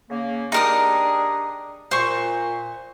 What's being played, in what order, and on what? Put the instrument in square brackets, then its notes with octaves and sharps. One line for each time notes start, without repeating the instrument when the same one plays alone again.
[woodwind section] C#3 A#3
[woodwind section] D4 G4 G#4 [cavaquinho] D#4 A#4 D#6
[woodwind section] A#2 [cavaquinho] C5 C#6